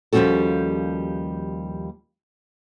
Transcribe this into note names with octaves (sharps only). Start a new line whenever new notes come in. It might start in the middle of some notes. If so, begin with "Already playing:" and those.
D#2 F3 G3 C#4 F#4 A4